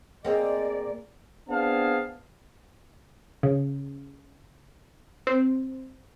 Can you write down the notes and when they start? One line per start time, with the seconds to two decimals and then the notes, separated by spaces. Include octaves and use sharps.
0.25 A#3 C4 G#4 D5 D#5
1.48 B3 C4 D4 G#4 F5 A5
3.43 C#3
5.27 C4